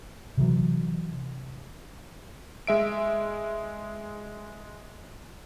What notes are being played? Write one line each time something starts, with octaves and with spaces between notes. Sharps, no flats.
C3 E3 F#3
G#3 E5 D7